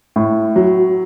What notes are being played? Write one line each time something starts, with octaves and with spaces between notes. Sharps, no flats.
A2
F#3